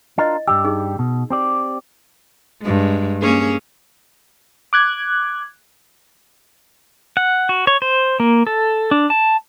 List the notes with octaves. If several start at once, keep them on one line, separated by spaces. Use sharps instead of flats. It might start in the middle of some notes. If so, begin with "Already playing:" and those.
D4 E4 F4 A#4 D#5
G2 G3 G4 E6
D#4 G#4
B2
C4 G4 D5
G2 G#3
A#3 C#4 G#4
D6 F#6 G#6
F#5
F#4
C#5
C5
A#3
A4
D4
A5